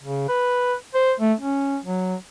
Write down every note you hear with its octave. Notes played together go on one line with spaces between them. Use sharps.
C#3
B4
C5
A3
C#4
F#3